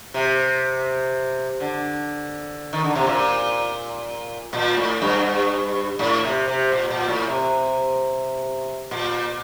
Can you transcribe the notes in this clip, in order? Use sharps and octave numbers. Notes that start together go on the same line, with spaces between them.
C3
D3
D#3
D3
C3
A#2
A#2
A2
G2
A2
C3
C3
A#2
A#2
A2
C3
A#2